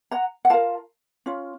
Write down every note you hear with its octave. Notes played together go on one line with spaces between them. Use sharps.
F#5 A#5
F#5
F4 A#4 F5 A5
C#4 F4